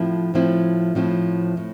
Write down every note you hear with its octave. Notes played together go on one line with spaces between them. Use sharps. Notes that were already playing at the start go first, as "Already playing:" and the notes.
Already playing: A2 F3 C4 E4
A2 F3 C4 E4
A2 F3 C4 E4
A2